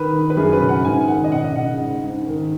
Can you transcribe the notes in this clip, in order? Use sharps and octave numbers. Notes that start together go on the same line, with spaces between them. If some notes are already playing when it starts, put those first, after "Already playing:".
Already playing: D#3 B4
D#3
B4
F#2 G#4
B4
C#3
F#5
G#2 G#5
D#3 F#5
D#5
C#3 F#5
D#5
C#3 F#5
G#2
G#2
D#3